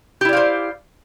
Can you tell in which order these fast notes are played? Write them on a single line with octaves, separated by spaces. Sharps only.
G4 E4 D5 F5 C5